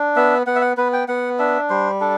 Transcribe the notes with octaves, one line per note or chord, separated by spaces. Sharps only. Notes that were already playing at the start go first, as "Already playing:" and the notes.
Already playing: D4
B3 E5
B3 F#5
E5
F#5
B3 B4
G5
B3 F#5
D4 E5
G3 C5
D4 A4